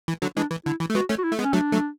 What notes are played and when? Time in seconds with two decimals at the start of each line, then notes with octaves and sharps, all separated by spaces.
0.08 E3
0.22 D3 F#3
0.37 E3 G#3 D4
0.51 E3
0.66 D3 E4
0.80 E3
0.90 A3
0.95 G#3 B3 F#4
1.09 A3 C#4
1.19 F#4
1.24 E4
1.32 A3
1.39 G#3 B3
1.44 C#4
1.53 F#3 A3 D4
1.72 F#3 A3